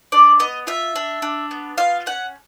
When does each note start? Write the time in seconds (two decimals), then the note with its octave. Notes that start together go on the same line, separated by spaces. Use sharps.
0.12 D4 D5
0.40 B3 D#5
0.67 F4 E5
0.96 D4
1.22 D4
1.51 B3
1.78 F4 F5
2.06 C#4 F#5